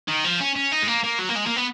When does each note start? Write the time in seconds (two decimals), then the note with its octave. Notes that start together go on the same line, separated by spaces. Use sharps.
0.08 D#3
0.24 F3
0.40 C#4
0.56 C#4
0.72 D#4
0.82 G#3
0.88 A#3
1.04 A#3
1.19 F#3
1.29 A#3
1.35 G#3
1.46 A#3
1.56 B3